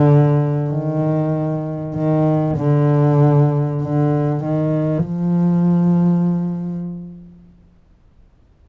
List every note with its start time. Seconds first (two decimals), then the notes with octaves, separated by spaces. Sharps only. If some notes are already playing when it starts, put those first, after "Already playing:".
Already playing: D3
0.70 D#3
1.95 D#3
2.57 D3
3.83 D3
4.45 D#3
5.08 F3